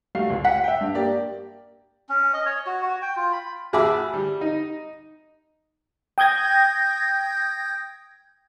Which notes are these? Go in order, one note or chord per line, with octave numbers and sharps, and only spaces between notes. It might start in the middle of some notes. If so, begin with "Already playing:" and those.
G3 A3 F#4 F5 C7
C#2
F#5 B6
E5 G5
G2
A#3 G4 D5
C#4
D#5
C#5
F#4
F#4
G5
F4
B5
A1 G#4 E5 B5 D6 E6
G3
D#4
G5 D#6 G6 G#6 A#6